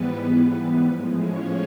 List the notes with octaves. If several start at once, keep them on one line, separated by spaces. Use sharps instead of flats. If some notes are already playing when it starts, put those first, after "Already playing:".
Already playing: G#2 E3 G3 B3 B4
A2 F3 G#3
C#4 C#5